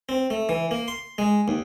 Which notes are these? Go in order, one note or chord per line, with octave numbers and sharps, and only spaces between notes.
C4
A3
E3
A#3
C6
G#3
D#2